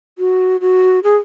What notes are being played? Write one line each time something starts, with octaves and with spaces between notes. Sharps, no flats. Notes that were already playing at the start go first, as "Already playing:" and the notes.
F#4
F#4
G#4